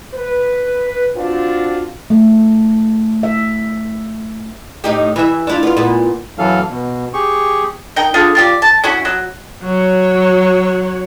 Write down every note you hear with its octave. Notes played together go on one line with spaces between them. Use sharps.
B4
C4 D4 F4 F#4
A3
E5
A2 D#4 G4
E3 E5
D4 E4 F4
B3 F4
A#2 B3
F#2 E3 F#3 A4 F5
B2
G4 G#4 C#6
D#4 A#4 G5
D3 F4 G#4
F4 G4 D5
A5
C#4 E4 F#4
F#3
F#3 C#5